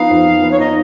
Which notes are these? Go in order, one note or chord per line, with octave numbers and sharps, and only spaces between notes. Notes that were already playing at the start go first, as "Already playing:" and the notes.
Already playing: F3 B3 D#4 F5
F2
F3
B3
C#5
D#4 D#5